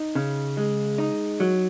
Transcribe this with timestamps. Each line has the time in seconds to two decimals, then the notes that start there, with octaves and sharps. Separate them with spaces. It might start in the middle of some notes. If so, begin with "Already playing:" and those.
Already playing: D#4
0.15 C#3
0.57 G#3
0.98 D#4
1.40 F#3